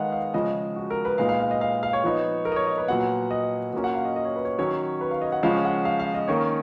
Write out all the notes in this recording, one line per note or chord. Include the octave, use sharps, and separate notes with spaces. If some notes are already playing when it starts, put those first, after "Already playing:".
Already playing: D#3 G#3 B3 D#4 D#5 F5 F#5
F5
C#3 F3 G#3 D#5
F#4
A#4
B4
A#2 G#3 B3 D#4 F5
F5
F5
D#5
F5
F5
C#5
F3 B3 D#4
A#4
D#5
C#5
D#5
B4
A#2 F#3 B3 F#5
D#5
A#2 F#3 A#3 C#4
F#5
F5
D#5
D#5
C#5
B4
C#5
D#3 F#3 C#4 C#5
B4
F5
D#5
F#5
C#3 F3 G#3 C#4 F5
F#5
F5
F5
D#5
D#3 A#3 C#4 C#5